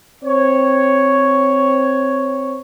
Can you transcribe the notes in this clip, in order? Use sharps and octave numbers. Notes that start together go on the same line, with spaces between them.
C4 C#5